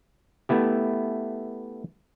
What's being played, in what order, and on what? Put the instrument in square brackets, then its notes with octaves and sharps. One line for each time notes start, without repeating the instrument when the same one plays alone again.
[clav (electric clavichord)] A3 B3 E4 G4